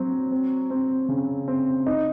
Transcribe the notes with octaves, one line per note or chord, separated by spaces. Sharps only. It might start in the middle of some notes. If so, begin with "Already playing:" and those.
Already playing: F#3 C4
C4
C4
C#3
C4
D#4